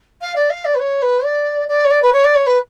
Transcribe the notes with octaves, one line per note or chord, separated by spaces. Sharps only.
F5
D5
F5
D5
B4
C#5
B4
D5
D5
C#5
D5
B4
C#5
D5
C#5
B4